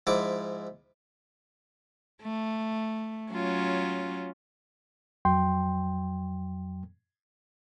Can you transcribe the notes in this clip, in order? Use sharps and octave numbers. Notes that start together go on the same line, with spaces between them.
G#2 F3 E4 E5 D6
A3
F#3 C#4 F4
F2 F#3 G5 C6